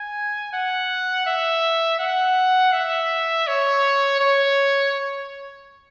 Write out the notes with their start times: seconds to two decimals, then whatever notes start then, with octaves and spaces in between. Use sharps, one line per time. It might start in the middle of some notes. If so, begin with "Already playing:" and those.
Already playing: G#5
0.53 F#5
1.26 E5
1.99 F#5
2.73 E5
3.47 C#5
4.20 C#5